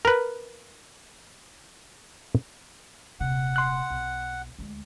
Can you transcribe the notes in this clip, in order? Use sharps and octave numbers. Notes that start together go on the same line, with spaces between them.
A#4 B4
D#1 C3 F#5
C6 F#6
B1
D2 G#3